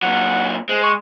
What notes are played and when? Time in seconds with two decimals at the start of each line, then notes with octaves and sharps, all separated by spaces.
0.02 A#2 F#3 F#5
0.69 G#3 C5
0.83 C#6